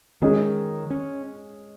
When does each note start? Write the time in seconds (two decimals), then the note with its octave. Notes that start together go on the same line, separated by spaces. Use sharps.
0.22 D#3 G#3 C#4 G#4 D#5
0.90 C#4